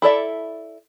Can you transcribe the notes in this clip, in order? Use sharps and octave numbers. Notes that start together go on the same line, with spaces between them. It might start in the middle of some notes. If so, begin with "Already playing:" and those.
E4 A4 D5 E5